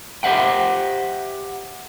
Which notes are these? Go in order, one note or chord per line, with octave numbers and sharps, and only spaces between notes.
G4 C5 E5 F#5 G5